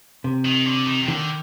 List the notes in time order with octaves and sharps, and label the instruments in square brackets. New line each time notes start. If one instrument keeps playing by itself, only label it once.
[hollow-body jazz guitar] C3
[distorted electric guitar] D#3
D3
D#3
C3
[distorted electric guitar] D3 [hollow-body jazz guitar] D#3